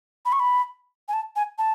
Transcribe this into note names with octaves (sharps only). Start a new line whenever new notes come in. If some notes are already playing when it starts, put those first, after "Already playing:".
B5
C#6
B5
G#5
A5
G#5
A5